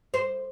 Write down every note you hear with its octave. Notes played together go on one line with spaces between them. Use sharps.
C5